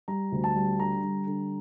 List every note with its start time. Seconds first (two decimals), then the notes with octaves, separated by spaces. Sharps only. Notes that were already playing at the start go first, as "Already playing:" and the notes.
0.08 G3 A#5
0.32 D2
0.44 A5
0.55 G3
0.79 D3 A#5
1.03 G3
1.27 D3